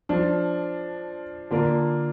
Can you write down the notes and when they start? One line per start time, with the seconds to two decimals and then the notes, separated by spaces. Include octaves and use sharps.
0.09 F3 D4 F4
1.51 D3 A#3 D4 F4 A#4